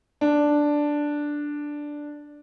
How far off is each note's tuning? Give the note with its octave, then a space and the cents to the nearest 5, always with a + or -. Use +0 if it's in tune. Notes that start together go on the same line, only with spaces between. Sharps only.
D4 +0